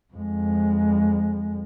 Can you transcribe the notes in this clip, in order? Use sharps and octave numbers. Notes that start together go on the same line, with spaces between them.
F2 G#3